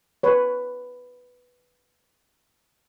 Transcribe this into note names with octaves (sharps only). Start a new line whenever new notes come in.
B4 C#5